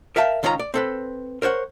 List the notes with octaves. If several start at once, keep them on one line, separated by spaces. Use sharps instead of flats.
A#4 E5 F5 G5 A5
C#2 D#3 C#4 F4 G#4 A#5
D5
C4 A4 B4
A#4 C5 C#5 F#5